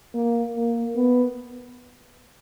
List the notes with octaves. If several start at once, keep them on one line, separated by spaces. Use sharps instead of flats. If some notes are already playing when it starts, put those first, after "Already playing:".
A#3
A#3
B3